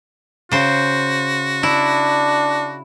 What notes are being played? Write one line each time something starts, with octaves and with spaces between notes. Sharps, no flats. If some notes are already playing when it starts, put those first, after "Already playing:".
C#3 F#4 C5
D4 E4